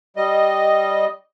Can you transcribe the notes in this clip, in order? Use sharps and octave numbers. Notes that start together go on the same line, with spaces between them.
G3 D#5